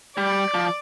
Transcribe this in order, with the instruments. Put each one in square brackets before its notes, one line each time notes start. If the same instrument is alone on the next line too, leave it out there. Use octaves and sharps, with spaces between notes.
[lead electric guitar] G3 [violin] D5
[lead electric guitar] F3